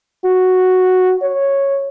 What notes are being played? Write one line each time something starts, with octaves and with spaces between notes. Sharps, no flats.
F#4
C#5